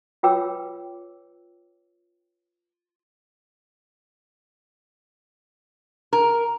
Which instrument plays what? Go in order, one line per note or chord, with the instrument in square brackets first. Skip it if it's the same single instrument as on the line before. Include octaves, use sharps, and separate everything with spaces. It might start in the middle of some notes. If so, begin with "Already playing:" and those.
[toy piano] F4 B4 C#5 G5 D6 E6
[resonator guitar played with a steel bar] A#4